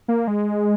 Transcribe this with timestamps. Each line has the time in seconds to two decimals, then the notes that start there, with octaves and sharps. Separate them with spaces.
0.08 A#3
0.28 G#3